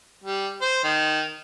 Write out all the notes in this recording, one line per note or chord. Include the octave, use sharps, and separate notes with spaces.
G3
C5
D#3